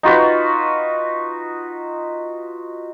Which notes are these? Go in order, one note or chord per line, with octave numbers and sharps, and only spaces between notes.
D#4 F4 F#4 B4